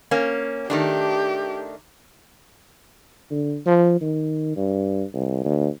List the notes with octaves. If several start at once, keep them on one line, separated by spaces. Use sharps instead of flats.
A#3 C#4
D#3 A3 D4 G4
D3
F3
D#3
G2
C2
D2